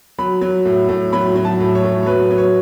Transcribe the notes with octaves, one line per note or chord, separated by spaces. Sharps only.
F#3 B5
F#3
A2
A2
F#3 B5
F#3
A5
A2
C#5
A2
C#5
F#3 B4
F#3
C#5